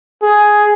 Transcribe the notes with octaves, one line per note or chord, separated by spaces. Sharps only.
G#4